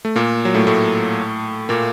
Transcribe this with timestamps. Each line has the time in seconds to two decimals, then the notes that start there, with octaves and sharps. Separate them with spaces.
0.05 A3
0.16 A#2 A#3
0.45 F#3
0.54 A2 A3
0.67 A2 A3
1.69 A#2 A#3